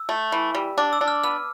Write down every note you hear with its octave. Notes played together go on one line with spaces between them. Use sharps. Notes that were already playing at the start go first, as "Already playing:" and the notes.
Already playing: E6
A3
E3
G3
D4 D6
E6
D4
F6
B3 F6